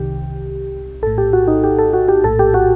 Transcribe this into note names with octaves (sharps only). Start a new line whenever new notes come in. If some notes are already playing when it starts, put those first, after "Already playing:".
Already playing: C2 C3 D#3 G4
A#1 A2 A4
G4
F#4
D#4
G4
A4
F#4
G4
A#1 A2 A4
G4
F#4